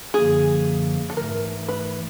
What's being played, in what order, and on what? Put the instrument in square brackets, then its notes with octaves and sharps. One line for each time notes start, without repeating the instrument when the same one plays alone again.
[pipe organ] F#2 D3 F3 A#3 [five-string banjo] G#4
[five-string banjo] A4
[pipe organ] G#2 E3 A3 [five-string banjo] A#4
[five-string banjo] B4